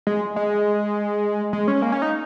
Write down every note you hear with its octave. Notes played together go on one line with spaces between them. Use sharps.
G#3
G#3
G#3
C#4
A#3
C#4
D#4